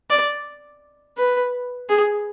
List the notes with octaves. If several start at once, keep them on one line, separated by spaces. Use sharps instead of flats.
D5
B4
G#4